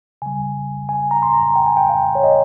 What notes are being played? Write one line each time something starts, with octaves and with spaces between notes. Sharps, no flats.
C#3 G3 G#5
G#5
A#5
C6
A#5
G5
G#5
G5
F5
C#5
D#5